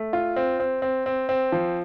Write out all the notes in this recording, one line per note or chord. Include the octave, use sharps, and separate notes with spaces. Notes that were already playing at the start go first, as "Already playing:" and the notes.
Already playing: A3
F4
C4
C4
C4
C4
C4
F3